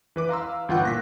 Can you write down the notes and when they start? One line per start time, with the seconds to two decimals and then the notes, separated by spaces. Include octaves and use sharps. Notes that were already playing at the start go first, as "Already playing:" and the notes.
0.16 E3 B4 D6
0.29 F5 A#5 C6 E6
0.42 F5
0.68 G1 E3 F4 F#5 G5 F#6
0.83 A#2 A#6 B6